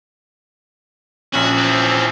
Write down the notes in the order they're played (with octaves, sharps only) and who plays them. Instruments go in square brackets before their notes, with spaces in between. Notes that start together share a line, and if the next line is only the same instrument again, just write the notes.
[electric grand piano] A#1 C#4 [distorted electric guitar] F#4
[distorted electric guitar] E3 C4